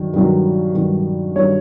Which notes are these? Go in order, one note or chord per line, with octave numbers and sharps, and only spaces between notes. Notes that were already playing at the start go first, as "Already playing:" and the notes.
Already playing: G2 D#3 F#3
G2 D#3 F#3
G2 D#3 F#3
G2 D#3 F#3 C#5